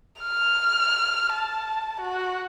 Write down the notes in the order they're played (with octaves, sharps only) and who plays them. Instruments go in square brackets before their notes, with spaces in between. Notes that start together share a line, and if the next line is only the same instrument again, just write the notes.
[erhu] F6
A5
F#4